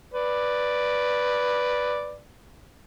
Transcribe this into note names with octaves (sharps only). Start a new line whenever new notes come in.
B4 D5